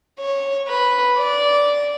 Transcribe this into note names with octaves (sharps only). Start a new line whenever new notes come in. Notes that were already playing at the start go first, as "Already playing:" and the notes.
C#5
B4
D5